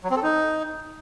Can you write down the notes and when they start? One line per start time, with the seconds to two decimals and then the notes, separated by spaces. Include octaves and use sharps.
0.04 F#3
0.10 C4
0.17 A4
0.23 D#4